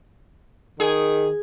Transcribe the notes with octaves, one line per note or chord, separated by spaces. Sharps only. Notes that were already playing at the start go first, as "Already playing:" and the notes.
D#3 G#4